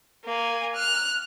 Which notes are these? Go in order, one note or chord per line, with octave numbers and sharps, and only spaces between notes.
A#3 G#5
F6 F#6